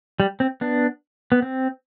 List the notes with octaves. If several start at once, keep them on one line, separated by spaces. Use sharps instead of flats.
G3
C4
B3 D4
B3
C4